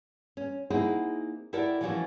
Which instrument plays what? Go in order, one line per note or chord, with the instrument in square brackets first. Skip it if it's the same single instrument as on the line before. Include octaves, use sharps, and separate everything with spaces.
[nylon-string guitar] C#4
A#3 C4 D#4 E4 F#4 G#4
E4 F#4 G4 A4 A#4 D5
E3 F3 A3 C#4 E4 F#4